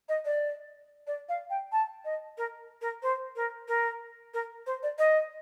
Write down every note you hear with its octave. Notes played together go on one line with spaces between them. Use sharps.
D#5
D5
D5
F5
G5
A5
D#5
A#4
A#4
C5
A#4
A#4
A#4
C5
D5
D#5